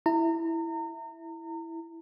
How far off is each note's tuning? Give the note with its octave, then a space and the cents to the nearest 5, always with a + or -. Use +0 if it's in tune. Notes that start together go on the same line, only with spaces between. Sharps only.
E4 +0 A#5 -35